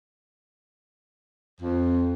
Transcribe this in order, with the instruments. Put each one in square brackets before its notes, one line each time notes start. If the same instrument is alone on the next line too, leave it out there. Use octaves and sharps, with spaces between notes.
[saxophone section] F2